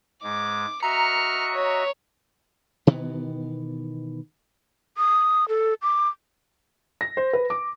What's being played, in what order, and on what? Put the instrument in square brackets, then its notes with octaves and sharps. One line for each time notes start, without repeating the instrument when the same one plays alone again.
[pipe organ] G#2 G#3 [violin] D6
[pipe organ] F#4 D#5 E5 [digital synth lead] A#5 [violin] F6 C#7
[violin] C#5
[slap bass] B2 D#3 E3 B3
[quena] D#6
A4
D6
[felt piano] A#6
C5
B4
D6